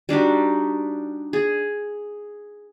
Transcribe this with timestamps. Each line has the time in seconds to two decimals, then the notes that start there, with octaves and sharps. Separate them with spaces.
0.09 G3 D4 D#4 F#4
1.33 G#4